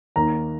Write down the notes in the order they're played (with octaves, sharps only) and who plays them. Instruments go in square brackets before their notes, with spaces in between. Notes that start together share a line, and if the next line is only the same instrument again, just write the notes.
[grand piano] D#2 D#3 A#3 A#5